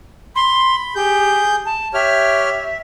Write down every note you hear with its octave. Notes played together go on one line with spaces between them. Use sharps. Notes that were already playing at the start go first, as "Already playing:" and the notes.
B5 C6
G4 G#4 G6
A5
G4 C#5 E5 F6